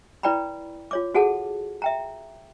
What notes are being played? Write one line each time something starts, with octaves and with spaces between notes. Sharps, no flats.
E4 B4 D5 G5 A#5 B5
F4 C#5 D6
F#4 G#4 A4 F#5 A5
E5 G5 A#5